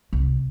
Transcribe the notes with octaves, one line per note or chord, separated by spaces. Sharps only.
C2